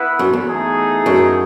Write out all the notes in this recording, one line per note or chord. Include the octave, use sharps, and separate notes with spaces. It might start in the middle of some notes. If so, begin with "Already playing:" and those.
Already playing: B3 E4 B4 F#5
F#2
E2
A3 D#4 G#4
F#2